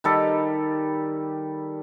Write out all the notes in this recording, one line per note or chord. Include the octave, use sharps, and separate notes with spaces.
D#3 G3 A4